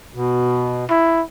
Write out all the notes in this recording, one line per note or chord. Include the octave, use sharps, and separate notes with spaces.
B2
E4